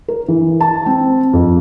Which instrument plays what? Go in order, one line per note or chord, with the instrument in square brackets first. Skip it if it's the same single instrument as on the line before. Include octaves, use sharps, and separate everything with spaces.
[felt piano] A#4
E3
A5
C4
F2